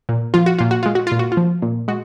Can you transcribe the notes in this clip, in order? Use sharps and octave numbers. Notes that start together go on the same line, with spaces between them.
A#2
F3 F4
F#4
A#2 F4
F#4
G#3 F4
F#4
A#2 F4
F#4
F4
F3
A#2
G#3 F#4